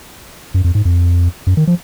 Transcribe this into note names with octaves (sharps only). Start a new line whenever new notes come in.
F#2
F2
G#2
F2
F#2
D#3
F3